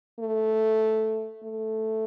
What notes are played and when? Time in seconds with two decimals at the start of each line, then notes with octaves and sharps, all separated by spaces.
0.19 A3
1.43 A3